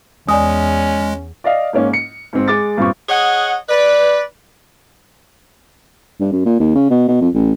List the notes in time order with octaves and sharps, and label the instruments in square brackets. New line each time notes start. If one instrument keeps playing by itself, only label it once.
[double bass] E2 [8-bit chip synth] G#3 [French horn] C#4 [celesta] D5 G#5 D#6
[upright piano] D5 D#5 F5
G#2 A#3 C#4
C#7
G#2 C4
G#3 D6 A6
G2 A#2 C4 C#6
[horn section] G#4 C#5 D#5 F#5
B4 D5
[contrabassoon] G2
F#2
A#2
D#2
C#3
B2
B2
F2
A1